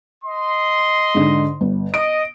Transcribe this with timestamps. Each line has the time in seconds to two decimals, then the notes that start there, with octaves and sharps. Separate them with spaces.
0.24 D#5 C6
1.15 G#2 D3
1.61 G1
1.94 D#5 D7